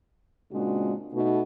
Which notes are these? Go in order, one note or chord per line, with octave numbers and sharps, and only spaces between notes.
A#2 C#3 G#3 C4 D4 F#4
B2 A3 D#4